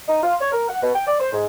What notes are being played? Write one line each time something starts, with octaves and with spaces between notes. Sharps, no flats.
D#4
F4
C#5
A#4
F#5
B2
G5
D5
C5
G#2